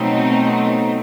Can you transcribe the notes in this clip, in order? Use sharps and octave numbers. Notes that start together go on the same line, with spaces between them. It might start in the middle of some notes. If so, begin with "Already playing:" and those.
Already playing: B2 F#3 A3 C4 D#4